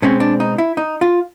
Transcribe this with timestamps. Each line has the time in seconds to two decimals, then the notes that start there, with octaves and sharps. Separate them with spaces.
0.02 B2 G#3 C4 C#4
0.20 D4
0.40 D#4
0.58 E4
0.77 D#4
1.01 F4